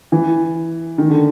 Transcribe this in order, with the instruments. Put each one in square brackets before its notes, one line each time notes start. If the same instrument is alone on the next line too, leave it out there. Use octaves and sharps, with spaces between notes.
[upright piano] E3
D#3
D3